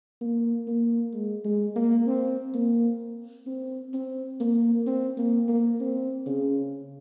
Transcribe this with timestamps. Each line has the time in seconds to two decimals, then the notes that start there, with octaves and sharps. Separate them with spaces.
0.21 A#3
0.68 A#3
1.14 G#3
1.45 G#3
1.76 A#3
2.07 C4
2.54 A#3
3.47 C4
3.94 C4
4.40 A#3
4.87 C4
5.18 A#3
5.48 A#3
5.80 C4
6.26 C#3